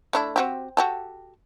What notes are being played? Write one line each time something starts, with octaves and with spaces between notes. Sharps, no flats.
A3 D4 E4
C4 F#4 G4
F#4 G4 A4